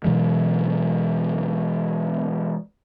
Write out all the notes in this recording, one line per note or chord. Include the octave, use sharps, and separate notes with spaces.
B2 E3 F#3 G#3